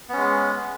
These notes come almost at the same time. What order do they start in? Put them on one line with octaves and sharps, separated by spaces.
B3 C#4 G#3